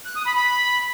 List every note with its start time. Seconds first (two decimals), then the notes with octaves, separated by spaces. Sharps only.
0.05 F#6
0.16 D#6
0.26 B5
0.36 B5